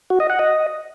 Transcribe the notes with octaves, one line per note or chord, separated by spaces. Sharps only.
F#4
D#5
F#5
D#5